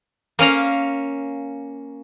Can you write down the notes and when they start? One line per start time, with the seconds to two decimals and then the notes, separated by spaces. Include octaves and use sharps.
0.39 A#3 C#4 F5 A#5